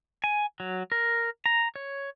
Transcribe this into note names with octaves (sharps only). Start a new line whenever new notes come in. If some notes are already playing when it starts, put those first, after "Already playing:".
G#5
F#3
A#4
A#5
C#5